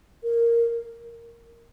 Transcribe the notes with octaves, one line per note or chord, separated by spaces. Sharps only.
A#4